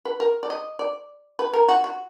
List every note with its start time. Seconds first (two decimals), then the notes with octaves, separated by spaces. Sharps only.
0.05 B4
0.20 A#4
0.43 D5
0.50 D#5
0.79 D5
1.39 B4
1.53 A#4
1.68 F#4
1.84 F#4